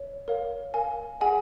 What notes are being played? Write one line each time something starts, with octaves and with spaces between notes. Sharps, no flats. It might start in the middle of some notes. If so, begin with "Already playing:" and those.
Already playing: C#5
A#4 C#5 F5
A#4 F5 G#5
G#4 D#5 F#5 G#5